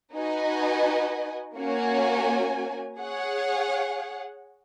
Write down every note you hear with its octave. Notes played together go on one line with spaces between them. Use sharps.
D#4 F#4 B4 D#5 G#5
A#3 C#4 F#4 C#5 G#5
G#4 C#5 F#5